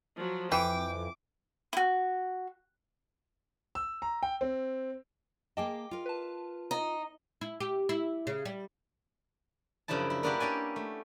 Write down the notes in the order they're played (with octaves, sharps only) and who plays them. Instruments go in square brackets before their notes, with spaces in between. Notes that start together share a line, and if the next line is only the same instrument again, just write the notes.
[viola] F3 F#3
[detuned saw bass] F2 [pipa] E3 [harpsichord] G5 [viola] D6
[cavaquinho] E4 F#4
[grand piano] E6
A#5
G5
C4
[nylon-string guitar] A#3 G#4 A5 [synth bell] D#5 G5 D6
[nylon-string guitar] F4 A#4
[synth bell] B4 A5
[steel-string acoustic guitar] D#4 [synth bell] D#5
[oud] E4
G4
E4
C#3
G3
[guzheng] F#2 C#3 F3 D4 E4 A5
E4
A#3 B3 D4 E4 F#4 G4
C#4 G4 D5 G#5
A3